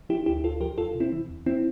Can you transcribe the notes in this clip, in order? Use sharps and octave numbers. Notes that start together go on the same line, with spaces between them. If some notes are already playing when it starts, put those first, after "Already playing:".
F3 E4 G4
D2 E4 G4
D2 F4 A4
F3 G4 A#4
E2 F4 A4
C3
C4 E4
E3
E2
E3 C4 E4